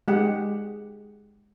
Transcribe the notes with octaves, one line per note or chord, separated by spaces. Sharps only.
G#3 G4 F#5